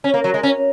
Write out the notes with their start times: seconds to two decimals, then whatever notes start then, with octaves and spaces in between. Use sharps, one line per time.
0.04 C#4
0.14 A#3
0.24 F#3
0.34 G#3
0.43 C#4